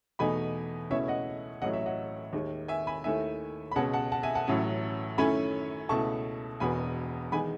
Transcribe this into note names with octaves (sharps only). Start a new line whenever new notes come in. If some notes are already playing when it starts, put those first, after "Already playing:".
E2 B2 A3 D#4 G#5 B5
C#2 B2 A3 C#4 E4 C#5 E5
D#5 F#5
A1 A2 F#3 D#5 F#5
C#5 E5
D#5 F#5
D#2 D#3 G#3
E5 G#5
G#5 B5
D#2 D#3 A3 E4 E5 G#5
B5
C#2 B2 G#3 C#4 F#5 A5
F#5 A5
F#5 A5
E5 G#5
F#5 A5
A1 A2 F#3 C#4 E4
F#2 D#3 A3 C#4 E4 G#5 B5
C#2 B2 A3 E4 A5 C#6
E1 E2 B2 G#5 B5
E2 D#3 G#3 G#5 B5